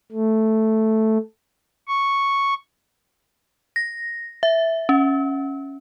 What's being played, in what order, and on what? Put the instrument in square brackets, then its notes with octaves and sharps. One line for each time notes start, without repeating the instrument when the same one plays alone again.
[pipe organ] A3
C#6
[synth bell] A#6
E5
C#4